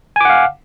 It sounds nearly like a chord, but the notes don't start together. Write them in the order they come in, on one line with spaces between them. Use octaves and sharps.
G#5 D6 F#5 F5